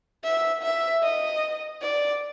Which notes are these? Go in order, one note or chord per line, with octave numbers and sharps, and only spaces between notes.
E5
E5
D#5
D5